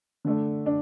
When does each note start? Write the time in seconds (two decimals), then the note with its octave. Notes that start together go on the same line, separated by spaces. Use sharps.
0.25 D3 A3 D4
0.66 D4